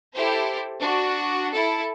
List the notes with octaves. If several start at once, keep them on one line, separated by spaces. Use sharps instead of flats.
E4 G4 A4 C5
D4 F#4
E4 A4